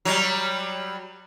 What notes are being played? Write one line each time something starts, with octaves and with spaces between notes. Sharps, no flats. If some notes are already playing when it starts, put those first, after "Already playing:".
F#3 G3